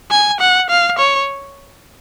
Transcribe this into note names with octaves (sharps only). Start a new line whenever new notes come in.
G#5
F#5
F5
C#5